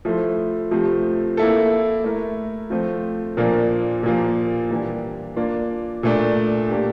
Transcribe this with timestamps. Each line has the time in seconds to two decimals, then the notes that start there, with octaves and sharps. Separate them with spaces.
0.05 F3 A3 E4 A4 C5
0.71 C3 F3 A3 C4
1.37 A#3 E4 A4
2.04 A3 E4 A#4
2.70 F3 A3 C4 F4
3.37 A#2 F3 A#3 D4
4.03 A#2 F3 A#3
4.70 E3 G3 A#3 D4 G4
5.36 A#3 D4 F4
6.03 A#2 A3 D4
6.69 A#3 D4 G4